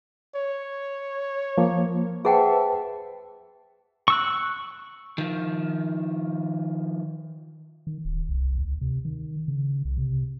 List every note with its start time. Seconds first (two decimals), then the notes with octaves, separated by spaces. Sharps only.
0.36 C#5
1.58 F3 A#3
2.25 G#4 B4 C5 E5 F#5 G5 A5
4.08 C#6 E6 F#6
5.18 D#3 F3
7.87 D#3
8.05 D1
8.29 C2
8.59 D2
8.81 C3
9.05 D#3
9.48 C#3
9.85 C2
9.98 C3